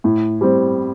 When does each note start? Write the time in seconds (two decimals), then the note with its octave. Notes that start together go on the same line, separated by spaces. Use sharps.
0.04 A2
0.41 G3 C4